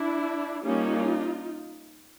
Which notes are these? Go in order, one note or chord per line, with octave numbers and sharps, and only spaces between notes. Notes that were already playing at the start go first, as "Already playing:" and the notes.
Already playing: D4 E4
G3 A#3 C#4 D#4 F4